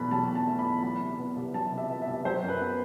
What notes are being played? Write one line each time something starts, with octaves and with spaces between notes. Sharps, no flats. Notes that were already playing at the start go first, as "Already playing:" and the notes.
Already playing: E2 B2 F#3 A3 B5
F#3 A5
B2
A5
A3
B5
E2
F#3 B5
C3
B3
C2
F#3 A5
C3
E5
B3
E5
C2
F#3 C5
F#2
B4
B3